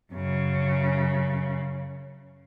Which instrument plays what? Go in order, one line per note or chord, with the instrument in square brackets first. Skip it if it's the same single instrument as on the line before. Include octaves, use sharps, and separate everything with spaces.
[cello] F#2 C#3